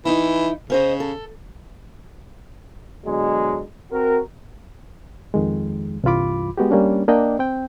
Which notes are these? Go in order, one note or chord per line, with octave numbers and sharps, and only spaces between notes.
E3 D#4 E4
C#3 C#4 C5 D#5
A4
B2 D3 F#3 G#3
C4 F#4 A#4
F2 D#3 G#3
C2 G2 E3 F4 B5 D6
G#3 B3 F#4 G4
G3 A#3 C#4 D4
A#3 D4 D5 D#5 G5
C4 G5